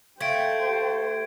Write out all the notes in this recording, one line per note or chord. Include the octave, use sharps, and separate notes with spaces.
A3 G4 C5 F5 G5 G#6 D7